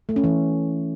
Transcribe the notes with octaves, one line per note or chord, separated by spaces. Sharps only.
A3
C#4
E3